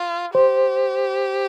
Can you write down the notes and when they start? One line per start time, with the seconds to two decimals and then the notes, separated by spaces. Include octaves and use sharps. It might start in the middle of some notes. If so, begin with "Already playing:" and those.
Already playing: F4
0.35 G4 C5